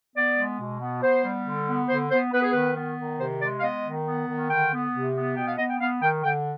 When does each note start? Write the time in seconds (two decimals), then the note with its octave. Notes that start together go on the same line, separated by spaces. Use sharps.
0.16 B3 D5
0.36 G#3
0.59 B2
0.80 B3
1.02 B3 C5
1.24 G3
1.46 D3
1.67 B3
1.89 D3 C5
2.10 B3 C5
2.32 B3 B4
2.43 G#4
2.52 D#3 B4
2.75 B3
2.97 D#3
3.19 C3 C5
3.41 G#3 D5
3.59 F5
3.62 B3 D#5
3.84 D#3
4.06 B3
4.28 D#3
4.50 D3 G5
4.72 B3
4.93 C3
5.15 B3
5.36 B2 G5
5.47 F5
5.58 B3 D#5
5.70 G5
5.79 B3 F5
6.02 D#3 G5
6.23 D3 G5